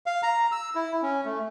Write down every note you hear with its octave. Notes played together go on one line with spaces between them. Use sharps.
F5
A#5
E6
E4
C#4
A3